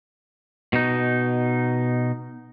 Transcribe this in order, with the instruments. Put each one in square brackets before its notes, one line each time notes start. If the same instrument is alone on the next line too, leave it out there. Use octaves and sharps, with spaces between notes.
[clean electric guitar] B2 D#4